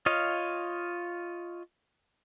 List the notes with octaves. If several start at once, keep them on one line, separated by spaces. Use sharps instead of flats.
F4 C#5 D#5 F5